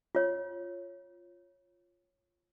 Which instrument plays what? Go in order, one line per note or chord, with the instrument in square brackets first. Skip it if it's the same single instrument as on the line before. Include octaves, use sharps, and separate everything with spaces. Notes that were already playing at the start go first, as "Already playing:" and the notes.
[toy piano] F4 C#5